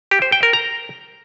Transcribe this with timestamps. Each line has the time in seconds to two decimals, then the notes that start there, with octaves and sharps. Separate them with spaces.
0.11 G4
0.22 C5
0.32 G5
0.43 A#4
0.53 A#5